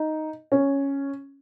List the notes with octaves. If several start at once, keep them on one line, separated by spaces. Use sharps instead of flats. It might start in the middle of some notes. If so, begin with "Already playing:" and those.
Already playing: D#4
C#4